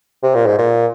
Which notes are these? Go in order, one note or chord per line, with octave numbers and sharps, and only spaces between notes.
C3
A#2
G#2
A#2